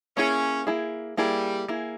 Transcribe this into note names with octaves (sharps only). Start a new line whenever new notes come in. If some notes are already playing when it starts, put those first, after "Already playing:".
A#3 C#4 E4 G#4
A#3 E4 G#4
G3 A#3 E4 G#4
A#3 E4 G#4